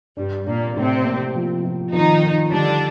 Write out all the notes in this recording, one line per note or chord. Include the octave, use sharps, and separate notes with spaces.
G2 G3 D4
A#2 A#3 D4
A2 C3 C4
A#3
F3
F3
D#3 F3 D#4
F3
D3 G3 D4